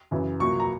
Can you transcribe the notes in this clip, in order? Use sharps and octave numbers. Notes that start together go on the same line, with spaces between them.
F#2 C#3 E3
C2 A#2 F#3 A#3 C#6
A#5